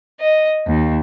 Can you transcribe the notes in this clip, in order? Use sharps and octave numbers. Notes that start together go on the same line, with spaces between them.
D#5
D#2